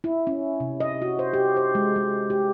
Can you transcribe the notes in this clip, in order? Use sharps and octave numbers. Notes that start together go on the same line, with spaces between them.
E4
C#4
C3
D#5
F#4
C5
G4
C5
G#3
G#3
G4